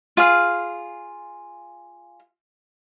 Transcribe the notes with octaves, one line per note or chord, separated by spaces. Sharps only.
F4 G#4 F5